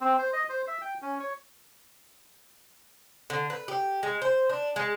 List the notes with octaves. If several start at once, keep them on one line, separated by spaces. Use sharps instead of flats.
C4
C5
D#5
C5
E5
G5
C#4
C#5
D3
B4
G4
G#3
C5
D4
G#3